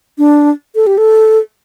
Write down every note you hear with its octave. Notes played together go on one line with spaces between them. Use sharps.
D4
A4
G4
A4